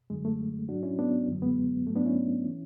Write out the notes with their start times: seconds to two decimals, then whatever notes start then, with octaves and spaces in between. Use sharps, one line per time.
0.10 F#2 D3 F#3 G#3
0.25 A3
0.69 G#2 F#3 D4 F#4
0.83 C#4 E4
0.99 B3 D4
1.28 F#2 D3 F#3
1.42 G#3 B3
1.86 G#2 F#3 A3
1.96 B3 D4
2.05 C#4 E4
2.46 E3